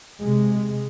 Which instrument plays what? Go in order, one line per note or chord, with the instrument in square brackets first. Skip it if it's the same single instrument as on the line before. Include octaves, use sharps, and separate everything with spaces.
[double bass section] C3 G#3